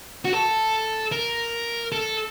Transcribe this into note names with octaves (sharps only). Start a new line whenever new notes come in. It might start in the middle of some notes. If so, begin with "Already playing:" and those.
F#4
A4
A#4
A4